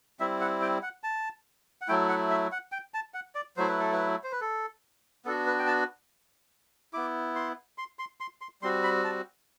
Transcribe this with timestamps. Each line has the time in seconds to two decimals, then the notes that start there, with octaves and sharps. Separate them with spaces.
0.20 G3 C4 E4 E5
0.41 F#5
0.62 G5
0.83 F#5
1.03 A5
1.81 F#5
1.88 F#3 A3 E4 G5
2.09 F#5
2.30 E5
2.52 F#5
2.72 G5
2.94 A5
3.14 F#5
3.35 D5
3.57 F#3 A3 E4 C5
3.68 B4
3.80 A4
3.92 B4
4.24 C5
4.32 B4
4.41 A4
5.25 B3 D4 F#4 A4
5.47 B4
5.59 G5
5.67 A5
6.93 B3 E4 D6
7.35 C6
7.78 C6
7.99 C6
8.20 C6
8.41 C6
8.62 G3 C4 F#4 C6
8.83 B5
9.04 A5